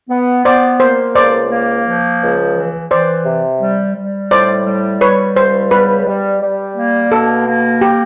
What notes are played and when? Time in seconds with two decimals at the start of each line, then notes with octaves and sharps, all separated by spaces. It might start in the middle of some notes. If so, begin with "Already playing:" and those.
0.10 B3
0.45 B3 C5 D5
0.80 A#3 C5
1.15 C#2 C5 D5
1.51 A#3
1.86 F3
2.21 C#2
2.55 E3
2.91 E3 C5 D5
3.26 C3
3.61 G3
3.96 G3
4.31 A2 C5 D5
4.66 G3
5.01 G3 B4 C#5
5.36 C#2 C5
5.71 G3 B4
6.06 G3
6.41 G3
6.76 A#3
7.12 B2 A4
7.47 A#3
7.81 G4